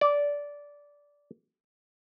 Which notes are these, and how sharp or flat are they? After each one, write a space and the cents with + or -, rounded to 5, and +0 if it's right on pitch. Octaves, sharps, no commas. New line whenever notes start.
D5 -15